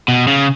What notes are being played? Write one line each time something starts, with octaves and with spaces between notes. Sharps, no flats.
B2
C#3